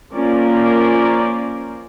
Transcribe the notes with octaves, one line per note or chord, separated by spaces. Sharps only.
F3 A#3 C#4 A#4 C5 D5